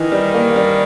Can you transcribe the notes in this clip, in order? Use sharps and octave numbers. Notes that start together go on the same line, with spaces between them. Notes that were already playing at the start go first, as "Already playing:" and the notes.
Already playing: D#3 E3
G3
A#3
G3